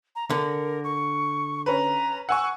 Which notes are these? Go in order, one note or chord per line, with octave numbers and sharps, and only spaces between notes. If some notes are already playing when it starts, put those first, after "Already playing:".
A#5
D3 A#4
C#6
C#4 B4 A#5
F#5 G#5 C#6 E6